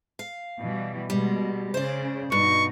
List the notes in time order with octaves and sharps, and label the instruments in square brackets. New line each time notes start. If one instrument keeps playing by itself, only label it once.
[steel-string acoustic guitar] F5
[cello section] B2 E3 G3
[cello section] B2 G#3 [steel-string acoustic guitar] G3
[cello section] C#3 [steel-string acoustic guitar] C5 D5
[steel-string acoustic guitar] G2 [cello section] B2 D#4 [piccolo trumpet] C#6